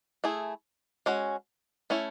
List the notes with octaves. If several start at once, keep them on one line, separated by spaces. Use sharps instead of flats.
A3 E4 G#4
G#3 C#4 F#4
A3 C#4 E4